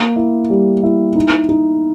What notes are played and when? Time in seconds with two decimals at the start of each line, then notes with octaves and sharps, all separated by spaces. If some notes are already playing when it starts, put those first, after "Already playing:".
Already playing: A#3
0.16 E4
0.50 G3
0.83 E4
1.15 D#4
1.49 D#4